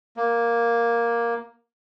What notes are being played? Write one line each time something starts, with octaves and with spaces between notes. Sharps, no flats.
A#3